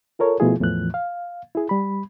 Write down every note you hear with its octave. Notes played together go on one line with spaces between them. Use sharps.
F4 A4 A#4 C#5
B2 F3 A3 E4 F4 G#4
E2 A2 E3 F3 F#6
F5
E4 G#4
G3 B5